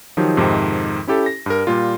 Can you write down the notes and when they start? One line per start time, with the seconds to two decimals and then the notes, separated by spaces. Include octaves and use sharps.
0.17 D#3 F3 F#3 D#4 G4
0.37 F2 G#2 C3 D#3
1.07 C#4 E4 G4 A4
1.26 A#6
1.46 G2 A#4
1.67 A#2 G3 F4